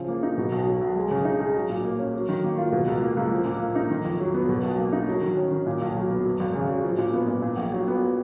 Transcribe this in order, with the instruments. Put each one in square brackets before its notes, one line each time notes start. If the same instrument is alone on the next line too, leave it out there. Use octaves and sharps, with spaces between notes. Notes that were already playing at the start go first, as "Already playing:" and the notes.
Already playing: [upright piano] C#3 F3
A#3
D#4
B2
B1
F#3
B1
G#3
C#3
D#4
G#4
F#3
A#2
A#3
C#4
F#3
D#3
A#3
F4
B2
C#2
A#3
C#2
F3
A#2
A#3
D#4
D#3
F2
F#3
B3
B2
B1
A#3
D#4
F#3
D#3
C#4
D#3
A#2
B1
F#3
B3
F#2
G#1
C#3
F#3
F3
A#2
B3
A#2
A#2
A#1
F#3
B3